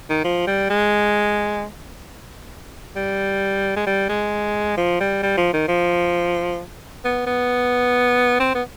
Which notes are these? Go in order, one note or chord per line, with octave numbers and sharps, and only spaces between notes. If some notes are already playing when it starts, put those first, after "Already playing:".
D#3
F3
G3
G#3
G3
G#3
G3
G#3
F3
G3
G3
F3
D#3
F3
B3
B3
C4
B3